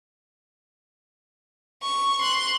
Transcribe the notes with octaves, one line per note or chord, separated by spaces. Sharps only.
C#6
C6 F#6